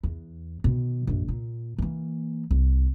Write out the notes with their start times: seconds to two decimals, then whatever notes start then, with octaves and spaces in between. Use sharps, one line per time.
0.03 E2
0.64 B2 D#3
1.07 A#1 F#2
1.28 A#2
1.78 E3 A#3
2.51 C2